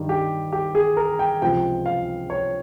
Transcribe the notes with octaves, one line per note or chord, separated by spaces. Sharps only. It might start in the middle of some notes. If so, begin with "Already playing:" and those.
Already playing: G2 D#3 G3
G4
G4
G#4
A#4
G5
C#2 C3 F3 G#3 G5
F5
C#5